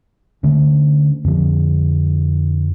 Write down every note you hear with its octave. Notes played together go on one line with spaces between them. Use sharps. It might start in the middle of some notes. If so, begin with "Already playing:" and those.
D3 A3 C#4
F2 D3 F3